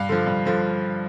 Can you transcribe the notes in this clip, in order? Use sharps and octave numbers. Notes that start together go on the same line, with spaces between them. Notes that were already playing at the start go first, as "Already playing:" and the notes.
Already playing: G2 F5
D3 F3
G2
D3 F3